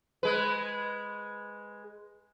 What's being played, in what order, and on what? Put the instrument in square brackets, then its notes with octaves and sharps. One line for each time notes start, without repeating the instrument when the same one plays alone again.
[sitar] G#3 B4